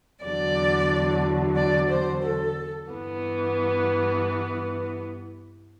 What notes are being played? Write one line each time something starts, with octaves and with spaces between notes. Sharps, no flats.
E2 D3 F#3 D5
D5
C5
A4
G2 E3 B3